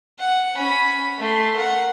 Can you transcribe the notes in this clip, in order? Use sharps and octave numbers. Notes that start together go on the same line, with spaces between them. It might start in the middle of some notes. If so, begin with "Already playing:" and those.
F#5
C#4 B5
A3 C6
A#4 F#5